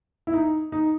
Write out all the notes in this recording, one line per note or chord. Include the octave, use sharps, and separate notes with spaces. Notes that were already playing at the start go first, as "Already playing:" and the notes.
E4
D#4
D#4